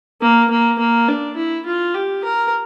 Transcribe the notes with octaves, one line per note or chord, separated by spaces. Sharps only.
A#3
A#3
A#3
D4
E4
F4
G4
A#4